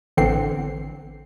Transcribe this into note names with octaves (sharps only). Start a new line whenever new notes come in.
A1 D3 E3 B3 C4 C7